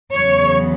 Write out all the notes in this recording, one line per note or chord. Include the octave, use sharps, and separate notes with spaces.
E2 C#3 F#3 B3 C#5